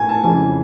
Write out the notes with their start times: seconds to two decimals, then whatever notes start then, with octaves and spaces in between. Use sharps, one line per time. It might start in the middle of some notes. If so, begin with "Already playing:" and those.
Already playing: A2 G#5
0.09 A5
0.23 F2 C#3 E3 G#5